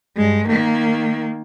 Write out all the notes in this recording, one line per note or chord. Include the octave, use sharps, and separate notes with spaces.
G2 G#3
D#3 A#3